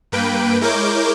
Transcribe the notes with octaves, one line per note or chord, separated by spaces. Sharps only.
G2 A#3 B4 G5 D7
G#3 E4 A#4 C#5 D6 G6